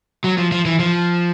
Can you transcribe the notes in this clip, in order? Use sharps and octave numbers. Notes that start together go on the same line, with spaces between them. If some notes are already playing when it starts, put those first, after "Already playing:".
F#3
F3
F3
E3
F3